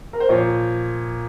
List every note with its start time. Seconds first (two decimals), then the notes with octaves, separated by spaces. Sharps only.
0.13 A#4
0.20 C5
0.29 A#2 F3 C#5